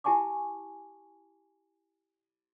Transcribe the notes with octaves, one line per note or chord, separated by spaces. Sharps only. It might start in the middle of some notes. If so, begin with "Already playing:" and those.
E4 G4 G#5 A5 C#6 D6